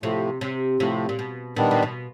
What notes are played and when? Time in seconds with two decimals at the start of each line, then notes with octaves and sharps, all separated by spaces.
0.03 A2 C3 F3 A3
0.41 C3
0.80 A2 C3 F3 A3
1.09 A#2
1.19 B2
1.56 A#2 D#3 G3 B3 D4
1.71 A#2
1.83 B2